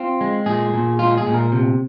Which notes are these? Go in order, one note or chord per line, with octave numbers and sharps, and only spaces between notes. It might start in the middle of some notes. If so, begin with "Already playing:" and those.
Already playing: C4 F4
G#3
A#2 G#4
A#2
G#3 F4
G#4
A#2
A#4
C3